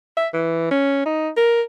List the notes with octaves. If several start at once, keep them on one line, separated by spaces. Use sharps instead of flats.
E5
E3
C#4
D#4
A#4